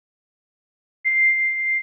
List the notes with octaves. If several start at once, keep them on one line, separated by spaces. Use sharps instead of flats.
C7